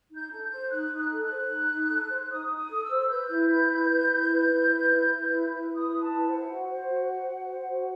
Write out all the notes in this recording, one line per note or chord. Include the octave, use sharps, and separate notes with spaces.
D#4
G6
A4
G6
C5
D#4 F#6
D#4
F#6
A4
F#6
C5
D#4
D#4
A4
C5
D#4 D#6
D#4
D#6
A4
E6
C5
B4 G6
E4
B4
E4
B4
E4
B4
E4
B4
E4
B4
E4
B4
E4
D#6
B4
A5
E4
C5 F#5
F#4
C5 F#5
F#4
C5
F#4
C5
F#4